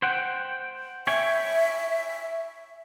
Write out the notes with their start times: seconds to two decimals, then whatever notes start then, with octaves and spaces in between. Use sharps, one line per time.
0.02 C5 F#5 G5
1.07 C#5 E5 G5 G#5